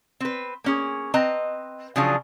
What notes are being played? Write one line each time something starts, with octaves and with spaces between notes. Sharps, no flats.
C4 B4
A#3 C#4 G#4
C4 B4 D#5 A#5
C#3 F3 F#3 D4 F4 G#4